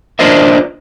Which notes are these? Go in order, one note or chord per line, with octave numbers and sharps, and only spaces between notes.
D4 F4 A#4 C5 D#5 E5